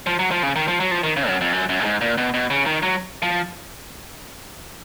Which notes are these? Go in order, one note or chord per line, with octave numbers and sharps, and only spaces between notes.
F3
F#3
F3
C#3
D#3
F3
F#3
F3
D#3
C#3
F#2
F2
F#2
F#2
A#2
G#2
A#2
B2
B2
C#3
D#3
F#3
F3